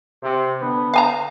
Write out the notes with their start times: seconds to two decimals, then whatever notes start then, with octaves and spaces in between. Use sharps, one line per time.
0.23 C3
0.61 D3 B3
0.94 F5 G#5 A#5